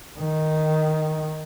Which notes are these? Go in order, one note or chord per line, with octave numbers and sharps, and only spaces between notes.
D#3